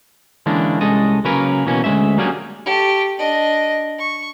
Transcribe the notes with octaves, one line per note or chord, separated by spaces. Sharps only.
D3 E3 G#3 A#3 C#4 D4
C2 G#3 C#4 A4 D#5
C#3 F#3 A#3 C#4 A#4 B4
B2 E3 A#3 C#4
D2 G2 G#3 C#4 E5
F#3 G3 A#3 C#4 D4 G#4
A3 G4
D4 D#5
C#6